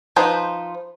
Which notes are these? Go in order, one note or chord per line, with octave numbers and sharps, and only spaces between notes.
F3 D#4 B4 C5